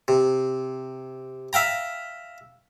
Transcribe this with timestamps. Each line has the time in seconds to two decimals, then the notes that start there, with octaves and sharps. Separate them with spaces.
0.08 C3
1.53 E5 F5 G5 A#5